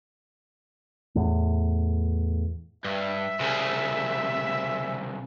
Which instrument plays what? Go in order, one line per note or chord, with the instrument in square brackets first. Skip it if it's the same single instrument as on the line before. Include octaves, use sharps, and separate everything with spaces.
[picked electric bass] E2 A2
[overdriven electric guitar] G2 [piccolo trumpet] E5
[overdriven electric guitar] C2 C#3